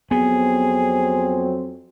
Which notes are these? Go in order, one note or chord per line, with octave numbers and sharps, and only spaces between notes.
F2 F#3 B3 C4 G#4